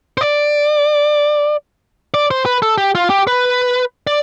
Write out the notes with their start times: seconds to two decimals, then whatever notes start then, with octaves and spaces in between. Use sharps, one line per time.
0.18 C5
0.21 D5
2.14 D5
2.31 C5
2.46 B4
2.62 A4
2.78 G4
2.95 F4
3.10 G4
3.27 B4
4.07 D5